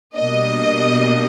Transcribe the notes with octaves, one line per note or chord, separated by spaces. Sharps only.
B2 G3 A#3 D4 D#5